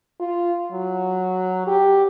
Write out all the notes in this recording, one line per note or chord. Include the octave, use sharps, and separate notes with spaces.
F4
F#3
G4